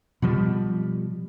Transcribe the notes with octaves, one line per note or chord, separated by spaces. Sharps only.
B2 F3 G3